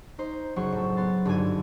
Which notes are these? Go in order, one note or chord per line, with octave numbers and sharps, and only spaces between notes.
D#4 C5
F#1 F#3 C5 C#6
A2 A4
B3 C6 A6
G#1 G2 D3 A4 G#5 D#7